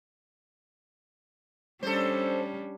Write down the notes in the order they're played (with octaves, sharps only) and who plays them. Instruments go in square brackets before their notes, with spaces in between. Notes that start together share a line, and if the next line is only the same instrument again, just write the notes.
[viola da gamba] G3 C#4 D4 [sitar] A4 C5